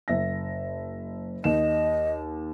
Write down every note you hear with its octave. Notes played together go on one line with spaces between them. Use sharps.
F#1 E5 A#6
D#2 D#5 E7